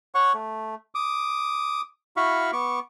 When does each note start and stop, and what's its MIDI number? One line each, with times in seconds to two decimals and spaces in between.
0.15 0.33 73
0.15 0.33 78
0.15 0.33 85
0.34 0.75 57
0.95 1.81 86
0.95 1.81 87
2.17 2.51 64
2.17 2.51 66
2.17 2.51 77
2.17 2.51 83
2.17 2.51 85
2.53 2.79 59
2.53 2.79 85
2.53 2.79 86